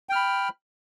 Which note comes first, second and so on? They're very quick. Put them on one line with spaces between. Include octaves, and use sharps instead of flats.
G5 F6 B5